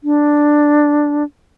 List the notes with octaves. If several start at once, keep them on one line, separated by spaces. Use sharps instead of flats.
D4